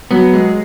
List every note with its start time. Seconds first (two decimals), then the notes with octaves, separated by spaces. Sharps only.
0.11 F#3 B3
0.34 G#3